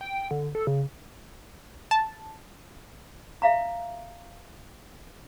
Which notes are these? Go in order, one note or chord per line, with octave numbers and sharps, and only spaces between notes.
G5
D3
A4
C#3
A5
E5 F5 A#5